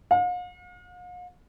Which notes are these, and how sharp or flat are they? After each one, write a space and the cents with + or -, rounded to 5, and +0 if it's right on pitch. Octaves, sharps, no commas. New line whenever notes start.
F5 +45